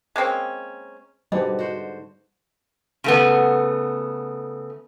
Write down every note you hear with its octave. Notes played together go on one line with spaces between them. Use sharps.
G#3 A#3 C4 C#4
G#2 B2 D3 G3 D#5
F#4 C5
C#3 A3 B3